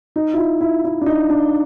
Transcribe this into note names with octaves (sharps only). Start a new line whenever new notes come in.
D#4
E4
F4
E4
E4
D4
D#4
D4